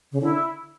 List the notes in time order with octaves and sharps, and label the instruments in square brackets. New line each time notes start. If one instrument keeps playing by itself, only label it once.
[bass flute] C#3
[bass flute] D3 [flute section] E4